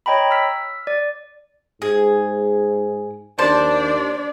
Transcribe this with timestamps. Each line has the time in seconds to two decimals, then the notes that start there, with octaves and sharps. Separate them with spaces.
0.06 C#5 D#5 G5 A#5 B5
0.31 E6 F6 B6
0.87 D5
1.82 G#2 G#4
3.39 D#2 D4 C5 D5 A5